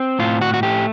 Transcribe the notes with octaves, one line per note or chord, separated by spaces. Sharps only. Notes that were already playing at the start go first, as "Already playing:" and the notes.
Already playing: C4
A2 F4
F#4
F#4
A3 G4